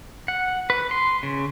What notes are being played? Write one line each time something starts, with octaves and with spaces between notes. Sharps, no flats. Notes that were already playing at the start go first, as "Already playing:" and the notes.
F#5
B4
C6
C#3